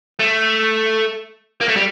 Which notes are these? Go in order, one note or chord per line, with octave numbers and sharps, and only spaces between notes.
A3
A#3
A3
G3